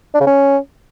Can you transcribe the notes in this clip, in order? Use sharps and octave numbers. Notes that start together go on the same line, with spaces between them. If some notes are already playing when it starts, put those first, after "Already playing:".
D4
C#3
C#4